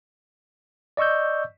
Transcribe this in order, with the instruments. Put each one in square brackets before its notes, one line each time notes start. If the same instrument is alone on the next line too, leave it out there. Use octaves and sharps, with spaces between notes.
[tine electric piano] D5 D#5 C#6 E6 G6